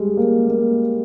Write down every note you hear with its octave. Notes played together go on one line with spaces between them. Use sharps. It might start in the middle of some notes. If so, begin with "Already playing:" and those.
Already playing: G3 G#3
A#3
A#3